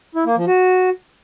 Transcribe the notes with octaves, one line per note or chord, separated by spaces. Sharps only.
E4
A#3
F3
F#4